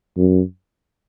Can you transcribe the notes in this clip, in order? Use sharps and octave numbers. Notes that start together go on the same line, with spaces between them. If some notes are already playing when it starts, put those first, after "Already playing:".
F#2